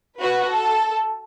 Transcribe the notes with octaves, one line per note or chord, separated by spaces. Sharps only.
F#4 B4
A4